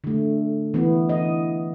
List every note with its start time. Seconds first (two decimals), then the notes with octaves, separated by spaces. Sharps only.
0.04 D3 A3
0.74 E3 B3
1.09 D#5